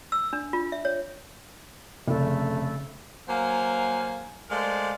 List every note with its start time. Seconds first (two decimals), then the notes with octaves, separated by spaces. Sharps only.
0.12 E6
0.33 D4
0.53 F4
0.72 E5
0.85 C#5
2.08 F1 C#3 A3
3.29 F#3 A#3 C5 F5 G#5
4.50 G#3 A3 A#4 C5 D5 F5